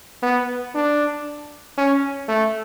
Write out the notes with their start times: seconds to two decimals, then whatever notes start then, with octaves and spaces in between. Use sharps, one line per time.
0.23 B3
0.75 D4
1.78 C#4
2.28 A3